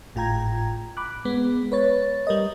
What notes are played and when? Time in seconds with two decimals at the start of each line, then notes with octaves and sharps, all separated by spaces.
0.15 G#1 A2 F4 G5 A#5 G#6
0.97 B5 D6 F#6
1.25 G#3 B3
1.72 B4 C#5 A6
2.27 G3 A#4 D#5